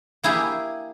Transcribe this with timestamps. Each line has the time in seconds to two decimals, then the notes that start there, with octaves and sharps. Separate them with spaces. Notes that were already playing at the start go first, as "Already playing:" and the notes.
0.23 A#3 E4 G4 G#4